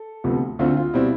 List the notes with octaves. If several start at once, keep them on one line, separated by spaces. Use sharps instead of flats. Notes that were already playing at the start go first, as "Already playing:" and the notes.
Already playing: A4
D2 C3 F3 B3
D2 D3 A3 C4 F4
F4
B2 G3 C4 E4